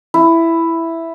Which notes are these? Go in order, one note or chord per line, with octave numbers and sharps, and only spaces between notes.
E4